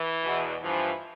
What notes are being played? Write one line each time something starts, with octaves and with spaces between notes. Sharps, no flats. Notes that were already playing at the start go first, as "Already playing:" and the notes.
Already playing: E3
E2 B2
G2 E3 F3